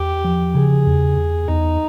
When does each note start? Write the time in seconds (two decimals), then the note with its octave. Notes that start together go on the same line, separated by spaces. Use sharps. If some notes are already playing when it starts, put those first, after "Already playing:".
Already playing: E2 G4
0.25 F3
0.54 C#3 G#4
0.86 E2
1.17 E2
1.48 E2 D#4